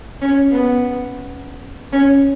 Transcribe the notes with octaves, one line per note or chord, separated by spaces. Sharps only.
C#4
B3
C#4